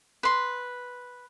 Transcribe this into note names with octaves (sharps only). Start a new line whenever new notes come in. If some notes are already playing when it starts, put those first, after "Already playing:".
B4 C6